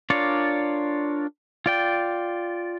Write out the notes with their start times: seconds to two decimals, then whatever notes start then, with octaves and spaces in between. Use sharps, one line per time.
0.10 D4 F4 A#4 C#5 D5
1.66 F4 D5 G5